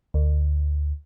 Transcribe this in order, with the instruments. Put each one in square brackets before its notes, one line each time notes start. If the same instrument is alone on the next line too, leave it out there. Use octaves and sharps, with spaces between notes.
[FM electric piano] D2